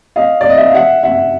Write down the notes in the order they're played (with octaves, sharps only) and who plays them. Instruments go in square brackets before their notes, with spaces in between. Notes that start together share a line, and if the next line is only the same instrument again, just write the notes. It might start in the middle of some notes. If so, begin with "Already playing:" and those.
[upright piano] D#5 F5
D5
D#5
E5
F5
E5 F#5
E5 F#5